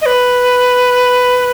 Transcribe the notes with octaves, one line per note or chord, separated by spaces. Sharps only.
D#5
B4